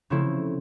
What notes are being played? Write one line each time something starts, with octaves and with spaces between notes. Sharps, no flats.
C#3 F3 A3 C4 E4